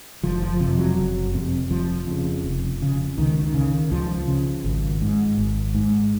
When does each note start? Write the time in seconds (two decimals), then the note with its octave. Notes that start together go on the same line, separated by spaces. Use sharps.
0.23 F#1 F3
0.42 F3
0.60 F2 C3
0.78 F#3
0.97 F#1
1.34 F2 C3
1.71 F1 F3
2.07 F2 C#3
2.44 F1
2.81 F2 C#3
3.18 C#2 D#3
3.42 D#3
3.54 C#3
3.67 D#3
3.91 C#2 F3
4.28 C#3
4.64 G#1
5.01 G#2
5.38 G#1
5.75 G#2